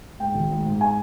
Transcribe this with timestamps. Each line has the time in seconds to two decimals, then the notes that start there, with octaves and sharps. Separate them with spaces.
0.19 G#2 G5
0.35 G#1
0.50 G#2
0.65 G#2
0.81 G#5